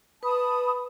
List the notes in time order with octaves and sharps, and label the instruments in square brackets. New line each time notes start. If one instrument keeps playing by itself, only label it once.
[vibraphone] B4 [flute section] A5 B5 D#6